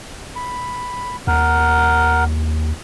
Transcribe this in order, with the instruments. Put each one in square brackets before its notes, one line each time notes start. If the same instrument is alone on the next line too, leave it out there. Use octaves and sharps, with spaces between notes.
[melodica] B5
[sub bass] D#2 [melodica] A#4 F#5